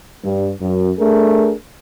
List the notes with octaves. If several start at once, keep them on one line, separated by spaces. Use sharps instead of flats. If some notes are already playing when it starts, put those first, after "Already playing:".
G2
F#2
A3 D4 G#4 A#4